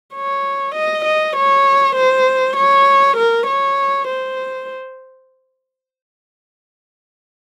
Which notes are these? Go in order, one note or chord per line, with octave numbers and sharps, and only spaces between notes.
C#5
D#5
D#5
C#5
C5
C#5
A#4
C#5
C5